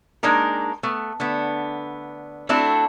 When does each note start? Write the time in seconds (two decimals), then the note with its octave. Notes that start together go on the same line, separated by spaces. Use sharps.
0.23 G#3 A#3 D4 D#4 A#4
0.83 A3 B3
1.20 D3 A3 B3
2.49 A3 C4 D4 E4 F#4 A4